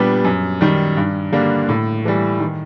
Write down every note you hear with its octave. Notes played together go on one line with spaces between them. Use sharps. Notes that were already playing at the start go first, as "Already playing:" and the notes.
Already playing: A#2 G3 B3 D4 G4
F#2
D#3 G3
G2
D3 G3 A#3 D4
A2
E3 G3
D#3